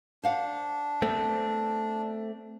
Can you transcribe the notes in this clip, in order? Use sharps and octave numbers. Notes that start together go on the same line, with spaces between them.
D4 C5 F5 F#5
A3 B3 C4